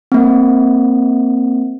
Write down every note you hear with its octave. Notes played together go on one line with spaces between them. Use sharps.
A#3 C4